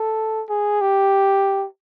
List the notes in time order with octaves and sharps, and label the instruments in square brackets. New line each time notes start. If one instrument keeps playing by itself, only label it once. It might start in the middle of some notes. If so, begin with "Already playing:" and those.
Already playing: [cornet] A4
G#4
G4